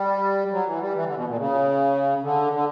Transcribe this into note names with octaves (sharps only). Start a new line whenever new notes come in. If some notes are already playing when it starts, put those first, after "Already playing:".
Already playing: G3
F#3
E3
G3
E3
D3
B2
A#2
C#3
D3
D3